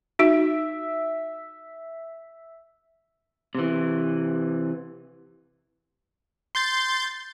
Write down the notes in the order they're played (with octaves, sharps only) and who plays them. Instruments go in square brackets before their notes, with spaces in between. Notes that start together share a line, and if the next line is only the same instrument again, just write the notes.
[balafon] D#4 F#4 [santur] E5
[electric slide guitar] C3 E3
[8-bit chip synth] C6 G6 A6